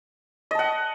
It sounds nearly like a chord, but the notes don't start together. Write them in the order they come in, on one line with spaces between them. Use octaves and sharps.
D#5 A5 F#5